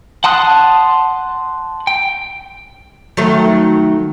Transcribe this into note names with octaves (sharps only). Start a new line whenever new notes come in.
F#5 A5 C6 D#6 F#6
G5
D#3 F#3 A3